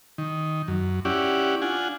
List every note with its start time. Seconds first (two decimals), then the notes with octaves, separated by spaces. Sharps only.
0.18 D#3
0.68 F#2
1.05 C#4 E4 G4 D5 F#5
1.62 D4 F4 F#5 G#5